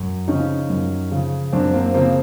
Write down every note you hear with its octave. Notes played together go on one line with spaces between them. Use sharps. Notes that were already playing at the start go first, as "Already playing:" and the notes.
Already playing: F#2
C#3 F3 C#4 D#4
F#2
C#3 F3
F#2 C4 D4
A#3 C4
C#3 F3 A#3 C4